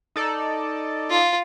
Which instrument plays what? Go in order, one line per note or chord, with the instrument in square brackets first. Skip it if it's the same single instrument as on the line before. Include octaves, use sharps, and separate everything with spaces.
[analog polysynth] D#4 A4 D5
[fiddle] F4